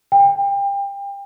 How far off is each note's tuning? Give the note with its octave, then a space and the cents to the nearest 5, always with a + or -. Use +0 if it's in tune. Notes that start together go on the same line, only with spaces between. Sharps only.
G5 +30